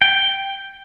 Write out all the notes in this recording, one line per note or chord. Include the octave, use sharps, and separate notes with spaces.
G5